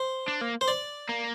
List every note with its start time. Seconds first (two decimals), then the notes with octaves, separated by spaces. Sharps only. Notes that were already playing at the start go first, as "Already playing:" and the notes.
Already playing: C5
0.28 D4
0.41 A#3
0.61 C5
0.68 D5
1.09 A#3